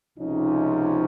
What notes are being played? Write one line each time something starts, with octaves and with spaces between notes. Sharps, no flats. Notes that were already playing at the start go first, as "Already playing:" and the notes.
C#2 C3 F3 C#4 D#4